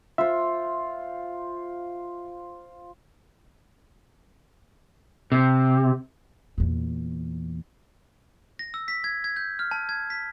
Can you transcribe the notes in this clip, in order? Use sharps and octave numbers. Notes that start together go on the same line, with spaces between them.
F4 C5 E5
C3
E2 A#2
A#6
E6
B6
G#6
G#6
G6
F6
A5
G#6
B6